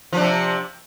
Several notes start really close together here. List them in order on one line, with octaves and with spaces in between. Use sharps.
F3 D4 C3